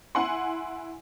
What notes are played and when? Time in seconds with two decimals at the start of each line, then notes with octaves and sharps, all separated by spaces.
0.15 E4 F#5 G#5 C6